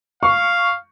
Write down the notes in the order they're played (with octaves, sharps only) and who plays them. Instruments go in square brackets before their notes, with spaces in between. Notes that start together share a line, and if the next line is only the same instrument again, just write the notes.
[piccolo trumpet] F5 [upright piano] C#6